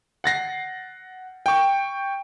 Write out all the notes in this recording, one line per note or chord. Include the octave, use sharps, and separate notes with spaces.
F#5 A6 A#6 C7
G5 C#6